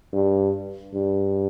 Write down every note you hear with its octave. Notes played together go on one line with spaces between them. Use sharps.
G2
G2